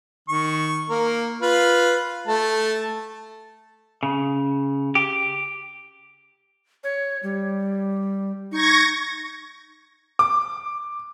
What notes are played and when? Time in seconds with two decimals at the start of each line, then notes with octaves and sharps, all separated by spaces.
0.28 D#3 C#6
0.90 A#3 A#4
1.42 F4 B4 F5
2.27 A3 A5
4.03 C#3
4.95 G4
6.84 C#5
7.23 G3
8.52 D#4 C#6 G#6 A#6
10.19 D6